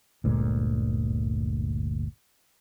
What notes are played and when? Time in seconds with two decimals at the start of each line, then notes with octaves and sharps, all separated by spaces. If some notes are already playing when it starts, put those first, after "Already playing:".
0.24 G1 D2 A#2 G#3